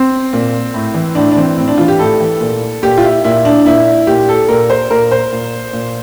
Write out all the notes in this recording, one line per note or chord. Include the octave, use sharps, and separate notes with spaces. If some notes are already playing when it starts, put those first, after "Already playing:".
Already playing: C4
A#2
A2
E3
A2 D4
D4
E3 C4
A2 C4
D4
E3 F4
G4
A2 A4
E3
A#2
A#2 G4
F4
E4
A#2 E4
D4
A#2 E4
A#2 G4
A4
A#2 A#4
C5
A#2 A#4
C5
A#2
A#2